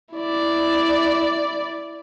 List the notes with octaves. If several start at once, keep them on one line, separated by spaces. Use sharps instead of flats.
E4 D5